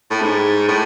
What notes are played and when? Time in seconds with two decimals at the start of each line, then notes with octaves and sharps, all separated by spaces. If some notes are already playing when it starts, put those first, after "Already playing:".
0.11 A2
0.22 G#2
0.68 A2